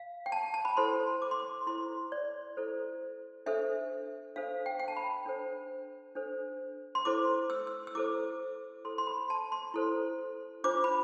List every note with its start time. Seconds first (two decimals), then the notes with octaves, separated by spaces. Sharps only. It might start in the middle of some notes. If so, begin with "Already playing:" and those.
Already playing: F5
0.26 G5
0.32 A5
0.54 A5
0.65 B5
0.77 E4 A4 C5 C6
1.22 D6
1.31 C6
1.40 D6
1.67 E4 A4 C5 C6
2.12 D5
2.57 E4 A4 C5
3.46 D4 A4 C5 E5
4.36 D4 A4 C5 F5
4.66 G5
4.79 G5
4.88 A5
4.97 B5
5.26 D4 A4 C5
6.15 D4 A4 C5
6.95 C6
7.05 E4 A4 C5 D6
7.50 E6
7.67 E6
7.87 E6
7.95 E4 A4 C5 D6
8.84 E4 A4 C5 C6
8.98 C6
9.07 B5
9.30 A5
9.52 C6
9.74 E4 A4 C5
10.64 D4 F4 C5 D6
10.84 B5